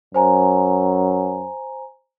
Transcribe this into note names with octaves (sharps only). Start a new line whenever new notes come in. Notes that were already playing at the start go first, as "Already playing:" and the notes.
F#2 C5 G#5 A#5